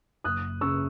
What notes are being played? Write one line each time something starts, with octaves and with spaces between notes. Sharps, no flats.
F#1 D#6 F#6
C#3 C#6 E6